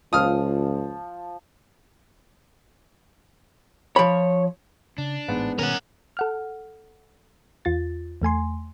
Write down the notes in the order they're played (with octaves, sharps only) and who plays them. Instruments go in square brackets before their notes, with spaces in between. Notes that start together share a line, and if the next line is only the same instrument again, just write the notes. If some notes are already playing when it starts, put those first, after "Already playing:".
[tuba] C#2 [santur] F3 [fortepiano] D#6 F6
[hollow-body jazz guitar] F3 B5 [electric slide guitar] C#5
[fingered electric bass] C#3 [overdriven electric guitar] D4
[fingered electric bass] A1 [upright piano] G#2 B3
[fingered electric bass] B2 D#3 G3 [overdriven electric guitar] C#4 [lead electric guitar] A#4 F#5
[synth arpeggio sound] A4 F#5 F6
E2 F4 A6
E2 A3 G#5 C6